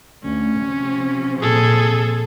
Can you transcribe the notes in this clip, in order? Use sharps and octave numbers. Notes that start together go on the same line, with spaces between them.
D2 C#4
C3 F3 C4
A#2 G#4 A4